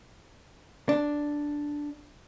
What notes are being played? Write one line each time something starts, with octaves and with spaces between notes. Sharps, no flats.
D4